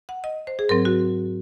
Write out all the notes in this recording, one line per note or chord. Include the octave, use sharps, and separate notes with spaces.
F#5
D#5
C5
G#4
G#2 F#3 C4 A#4
F#4